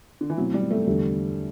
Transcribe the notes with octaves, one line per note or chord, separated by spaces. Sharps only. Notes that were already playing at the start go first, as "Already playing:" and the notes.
D3
E3
B2 F#3 A3 C4 E4
G3
A3
E2 D3 G3 A3 D4